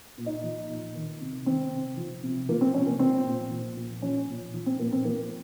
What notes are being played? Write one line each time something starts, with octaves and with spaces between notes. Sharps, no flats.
A#2
D#4
F3
A#2
D#3
C3
D#3 C4
C3
F3
C3
F3 A#3
C4
C3 C#4
A#3
F3 C4
A#2
F3
A#2
F3 C#4
A#2
F3
C4
A#2 A#3
C4
F3 A#3